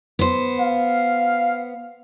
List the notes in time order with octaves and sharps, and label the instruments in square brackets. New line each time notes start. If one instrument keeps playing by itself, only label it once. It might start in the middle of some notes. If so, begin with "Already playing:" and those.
[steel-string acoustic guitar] B3 C5
[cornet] F5